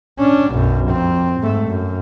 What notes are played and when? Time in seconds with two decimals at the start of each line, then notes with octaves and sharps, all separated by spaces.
0.19 C#4 D4
0.53 B1 F#2
0.90 F2 C4
1.41 G#2 A3
1.70 F#2